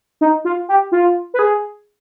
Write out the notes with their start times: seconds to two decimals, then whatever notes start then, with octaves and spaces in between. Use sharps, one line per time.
0.21 D#4
0.45 F4
0.68 G4
0.92 F4
1.34 B4
1.39 G#4